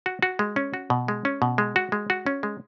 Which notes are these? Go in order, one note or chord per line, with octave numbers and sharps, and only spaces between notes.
F#4
F#4
G#3
C#4
F#4
B2
G#3
C#4
B2
G#3
F#4
G#3
F#4
C#4
G#3